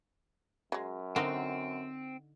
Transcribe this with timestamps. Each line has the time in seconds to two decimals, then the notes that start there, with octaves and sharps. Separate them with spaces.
0.72 F#2 F#3 G#3
1.16 D3 C4 D#4 F#4 A#4 C5